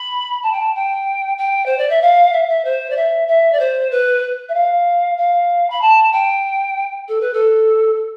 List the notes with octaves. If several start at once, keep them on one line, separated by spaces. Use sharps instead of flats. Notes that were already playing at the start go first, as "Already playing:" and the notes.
Already playing: B5
A5
G5
A5
G5
G5
C5
D5
E5
F5
E5
E5
C5
D5
E5
E5
D5
C5
B4
E5
F5
F5
B5
A5
G5
A4
B4
A4